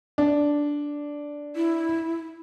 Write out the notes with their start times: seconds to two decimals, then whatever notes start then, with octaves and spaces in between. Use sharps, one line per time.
0.18 D4
1.56 E4